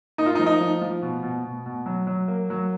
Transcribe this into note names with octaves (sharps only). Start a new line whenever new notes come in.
A#3 D#4
F4
D#4
F3
D#4
F3
F3
B2
B2
B2
B2
F#3
F#3
A#3
F#3